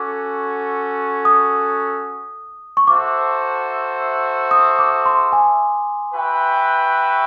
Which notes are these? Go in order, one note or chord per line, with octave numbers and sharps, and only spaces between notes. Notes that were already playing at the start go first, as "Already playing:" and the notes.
Already playing: C#4 F#4 A4 D6
D#6
C#6
F#4 A4 C5 E5 D6
D#6
D6
C6
G#5
F#4 B4 E5 G5